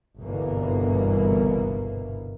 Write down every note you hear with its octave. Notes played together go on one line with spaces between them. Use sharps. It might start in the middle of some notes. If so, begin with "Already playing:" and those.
G1 C2 G#2 B2 E3 A#3